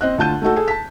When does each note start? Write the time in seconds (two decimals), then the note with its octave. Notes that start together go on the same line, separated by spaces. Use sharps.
0.01 C4 D#5 F#6
0.18 D2 F4 A5 G6 D#7
0.42 A3 D#4 F#4 A4
0.56 G#4 A4
0.68 A5 B6